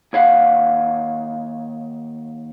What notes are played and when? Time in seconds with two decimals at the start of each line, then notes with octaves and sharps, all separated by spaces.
0.13 D#2 C#5 F5 F#5